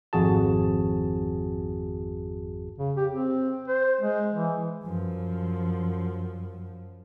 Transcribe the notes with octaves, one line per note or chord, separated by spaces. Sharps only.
G#1 F2 F#4 G#4 A5
C#3
G4
C4
C5
G#3
E3
F#2 F3